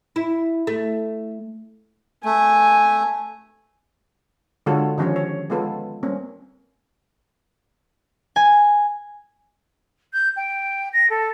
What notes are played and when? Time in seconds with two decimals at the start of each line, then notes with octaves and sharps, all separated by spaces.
0.16 E4
0.67 A3
2.25 A3 G#5
4.66 D3 G#3 F4 F#4 A4 C#5
4.98 D#3 F3 C#4 G4 C#5
5.16 C#5
5.50 G#3 B3 F4 A4 B4
6.03 G3 A#3 C4 C#4
8.36 G#5
10.13 G6
10.36 G5
10.93 A#6
11.09 A4